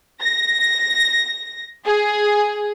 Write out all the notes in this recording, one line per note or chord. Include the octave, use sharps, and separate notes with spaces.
A#6
G#4